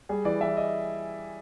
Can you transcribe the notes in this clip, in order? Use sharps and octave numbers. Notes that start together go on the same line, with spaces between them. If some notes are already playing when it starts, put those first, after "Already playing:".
G3 G#4
E3 D5
E3 E5
D#5